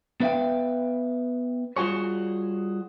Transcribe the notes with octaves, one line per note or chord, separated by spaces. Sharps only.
B3 B4 E5 F5 G5
G3 F4 F#4 G#4 C#5